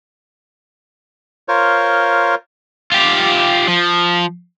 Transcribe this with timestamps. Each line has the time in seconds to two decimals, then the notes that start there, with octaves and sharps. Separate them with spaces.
1.48 F4 A#4 C5 C#5
2.92 F4 G4
3.68 F3